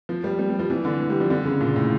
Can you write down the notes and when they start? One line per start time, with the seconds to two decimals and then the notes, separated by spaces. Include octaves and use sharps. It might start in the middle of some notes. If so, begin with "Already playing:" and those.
0.09 F3
0.24 G3
0.39 G3
0.50 G3
0.59 F3
0.70 E3
0.85 D3
1.00 E3
1.10 G3
1.20 F3
1.30 D3
1.45 C#3
1.61 A#2
1.76 A2